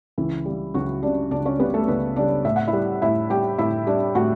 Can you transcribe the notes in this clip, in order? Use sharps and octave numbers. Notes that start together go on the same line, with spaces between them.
C#2 E3 E4
C#3 G3
C#2 F#3 F#4
C#3 G3 D4 D5
C#2 D4 D5
C#4 C#5
C#3 G3 B3 B4
A3 A4
C#2 B3 B4
C#3 G3 D4 D5
A2 E5
F#5
E4 E5
G3
A2 E4 E5
G3 G4 G5
A2 E4 E5
G3 D4 D5
A2 F#4 F#5